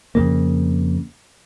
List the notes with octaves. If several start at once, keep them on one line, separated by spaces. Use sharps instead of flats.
F2 C#3 A#3